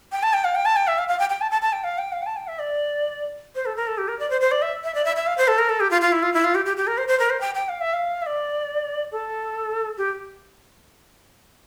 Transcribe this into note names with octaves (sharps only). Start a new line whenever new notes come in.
G5
A5
G5
F5
G5
A5
G5
E5
F5
F5
G5
G5
A5
A5
A5
G5
F5
G5
F5
G5
A5
G5
E5
D5
C5
A4
A#4
A4
G4
A#4
D5
C5
C5
D5
E5
E5
D5
E5
E5
F5
C5
A4
A#4
A4
G4
F4
F4
E4
F4
E4
F4
G4
G4
G4
A#4
C5
C5
A#4
C5
G5
G5
F5
E5
F5
E5
D5
A4
G4